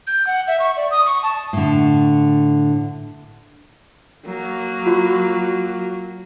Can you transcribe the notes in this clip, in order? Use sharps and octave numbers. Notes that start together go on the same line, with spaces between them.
G6
F#5
E5
C#6
D5
D#6
C#6
A5
A2 D3
F#3 A#3
F4 F#4